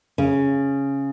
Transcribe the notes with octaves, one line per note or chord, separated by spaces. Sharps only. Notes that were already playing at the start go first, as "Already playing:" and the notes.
C#3